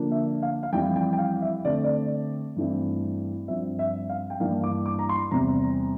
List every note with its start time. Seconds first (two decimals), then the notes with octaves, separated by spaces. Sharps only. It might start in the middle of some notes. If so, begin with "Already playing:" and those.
Already playing: D3 F3 A#3 D4
0.11 E5
0.42 F5
0.63 F5
0.73 F2 E3 G3 G5
0.96 G5
1.13 G5
1.19 F5
1.42 E5
1.65 D3 A3 C4 D5
1.84 D5
2.56 G2 E3 A3 C4
3.48 G2 F3 C4 E5
3.79 E5
4.09 F5
4.30 G5
4.40 G2 E3 A#3 D4 F5
4.64 D6
4.86 D6
4.99 A#5
5.09 C6
5.31 E2 C3 G3 C4 A#5